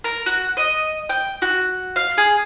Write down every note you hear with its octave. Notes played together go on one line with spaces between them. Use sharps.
A#4
F#4
D#5
G5
F#4
F5
G#4